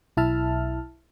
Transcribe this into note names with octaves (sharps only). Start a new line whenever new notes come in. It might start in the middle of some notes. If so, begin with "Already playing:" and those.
B1 E4 E5 A5 F6